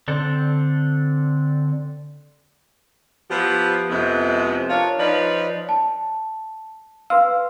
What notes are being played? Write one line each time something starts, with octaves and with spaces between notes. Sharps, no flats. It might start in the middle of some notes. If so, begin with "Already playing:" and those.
D3 C4 D4 A4
F3 B3 E4 G4
F2 C3 G#3 B3 E4
D4 F4 A#4 C#5
F3 D#4 B4 C#5 D5
A5
B4 F5 C6 E6